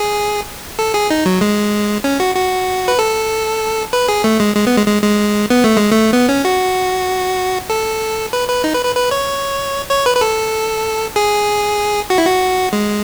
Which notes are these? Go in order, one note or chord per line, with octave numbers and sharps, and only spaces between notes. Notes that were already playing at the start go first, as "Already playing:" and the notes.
Already playing: G#4
A4
G#4
D#4
F#3
G#3
C#4
F#4
F#4
B4
A4
B4
G#4
A3
G#3
G#3
B3
G#3
G#3
G#3
B3
A3
G#3
A3
B3
C#4
F#4
A4
B4
B4
D#4
B4
B4
B4
C#5
C#5
B4
B4
A4
G#4
F#4
E4
F#4
G#3